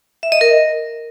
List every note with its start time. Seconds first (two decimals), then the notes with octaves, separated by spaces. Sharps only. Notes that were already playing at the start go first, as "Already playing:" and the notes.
0.23 E5
0.32 D#5
0.41 A#4